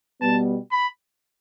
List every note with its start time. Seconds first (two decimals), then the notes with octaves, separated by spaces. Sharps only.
0.21 B2 G3 B3 A5
0.72 B5